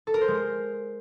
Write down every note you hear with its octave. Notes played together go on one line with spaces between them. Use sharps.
A4
A#4
C5
G#3